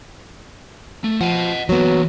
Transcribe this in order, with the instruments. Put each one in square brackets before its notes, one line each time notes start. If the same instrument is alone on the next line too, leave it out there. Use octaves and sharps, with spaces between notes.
[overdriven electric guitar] A3
[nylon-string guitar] F3 [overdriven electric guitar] D#5 F#5
[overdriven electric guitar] E3 A#3 [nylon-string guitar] F#3 B3